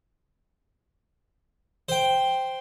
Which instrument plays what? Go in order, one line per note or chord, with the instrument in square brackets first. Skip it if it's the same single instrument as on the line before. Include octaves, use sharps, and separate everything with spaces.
[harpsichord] C5 G5